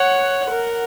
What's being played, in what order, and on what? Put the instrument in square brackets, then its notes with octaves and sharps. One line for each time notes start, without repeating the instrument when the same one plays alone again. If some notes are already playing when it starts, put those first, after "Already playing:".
Already playing: [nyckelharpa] C#5 [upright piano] F#5
[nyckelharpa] A#4